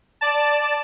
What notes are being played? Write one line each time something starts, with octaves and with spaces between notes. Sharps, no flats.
D5 A5